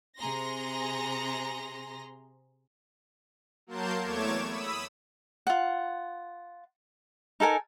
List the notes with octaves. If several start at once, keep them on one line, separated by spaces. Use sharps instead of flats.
C3 G#4 A#5 C6 A#6
F#3 A#3 A#4 A5 C6 G6
E2 A3 C#5 D6 G#6 E7
B5 D#6 E6
F4 F#5
D#4 A4 A#4 G#5